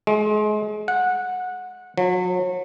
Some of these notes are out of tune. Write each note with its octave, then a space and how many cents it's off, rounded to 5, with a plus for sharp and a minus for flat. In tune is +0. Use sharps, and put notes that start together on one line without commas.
G#3 +30
F#5 -15
F#3 -35